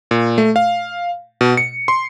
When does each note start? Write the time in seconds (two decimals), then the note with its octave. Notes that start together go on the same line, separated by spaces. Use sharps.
0.11 A#2
0.38 A3
0.56 F5
1.41 B2
1.57 C#7
1.88 C6